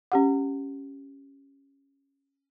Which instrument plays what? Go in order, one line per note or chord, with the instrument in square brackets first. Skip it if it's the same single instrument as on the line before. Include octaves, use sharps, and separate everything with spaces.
[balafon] C#4 G4 F#5